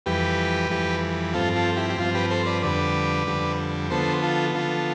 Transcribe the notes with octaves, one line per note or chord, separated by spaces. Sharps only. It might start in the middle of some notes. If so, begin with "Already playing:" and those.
F2 E3 G3 G4 B4
F2 E3 G3
G2 F3 C4 F4 A4
F4 A4
E4 G4
G4
G2 F3 C4 F4
G4 B4
A4 C5
B4 D5
F2 D3 G3 B4 D5
F2 D3 G3
D3 F3 B3 A4 C5
F4 A4
D3 F3 B3 F4 A4